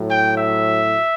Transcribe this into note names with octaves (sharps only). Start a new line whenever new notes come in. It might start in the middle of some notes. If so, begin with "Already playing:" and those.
Already playing: A2 F#3
G5
E5